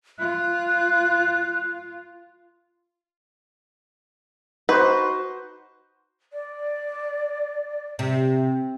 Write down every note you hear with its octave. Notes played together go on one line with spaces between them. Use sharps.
F4 F#6
D#4 F#4 B4 C5
D5
C3